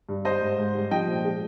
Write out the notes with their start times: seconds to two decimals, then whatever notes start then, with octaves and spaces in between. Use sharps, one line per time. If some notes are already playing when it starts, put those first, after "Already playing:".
0.09 G2
0.25 G3 C5 D#5
0.41 G#2
0.58 G#2
0.75 G3
0.91 F3 D#5 G5
1.08 A#2
1.25 G#3